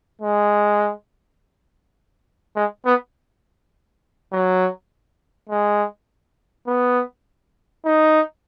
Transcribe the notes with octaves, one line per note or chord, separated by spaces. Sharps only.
G#3
G#3
B3
F#3
G#3
B3
D#4